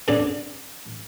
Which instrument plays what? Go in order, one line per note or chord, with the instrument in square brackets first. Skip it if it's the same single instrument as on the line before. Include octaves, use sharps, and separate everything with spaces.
[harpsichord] G2 C#3 B3 D4